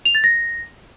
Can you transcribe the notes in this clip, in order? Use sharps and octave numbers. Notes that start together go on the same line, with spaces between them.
F7
A6
A#6